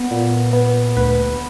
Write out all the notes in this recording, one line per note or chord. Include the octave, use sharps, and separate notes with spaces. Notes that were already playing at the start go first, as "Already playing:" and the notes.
Already playing: B3
A#2
B3
D2 B4